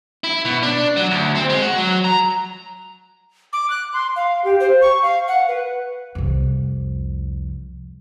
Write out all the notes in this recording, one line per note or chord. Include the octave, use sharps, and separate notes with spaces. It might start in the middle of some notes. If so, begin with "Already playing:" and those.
E4
B2
D4
F#3
D2
C4
G#3
F#4
F#3
A#5
D6
F#6
C6
F5
G4
C5
C#6
F5
F#5
B4
C2 F2